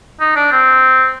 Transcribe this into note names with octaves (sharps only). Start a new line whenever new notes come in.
D#4
D4
C4